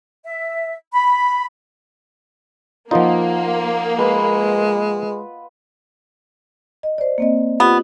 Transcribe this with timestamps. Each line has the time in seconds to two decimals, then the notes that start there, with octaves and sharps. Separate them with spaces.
0.25 E5
0.94 B5
2.91 F3 A#3 D#4 F4 D#5 F#5
3.99 G#3 B4
6.83 D#5
6.98 C5 D5
7.18 A#3 C4 D#5
7.60 B3 F4 G4